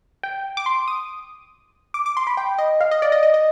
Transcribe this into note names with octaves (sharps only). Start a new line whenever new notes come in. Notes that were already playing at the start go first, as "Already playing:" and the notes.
G5
D6
C6
D#6
D6
D6
C6
B5
G5
D#5
F5
D#5
D5
D#5
D#5
D#5